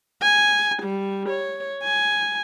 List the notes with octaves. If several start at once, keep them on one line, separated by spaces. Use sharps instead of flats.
G#5
G3
C#5
G#5